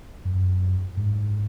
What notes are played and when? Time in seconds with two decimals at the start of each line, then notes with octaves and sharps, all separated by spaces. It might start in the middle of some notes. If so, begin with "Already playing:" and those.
0.25 F#2
0.97 G#2